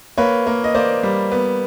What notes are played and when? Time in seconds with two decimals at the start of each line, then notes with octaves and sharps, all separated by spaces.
0.18 A#3 B4 C#5
0.47 A#3
0.64 D#5
0.75 A#3 C5 D5
1.03 G3
1.32 B3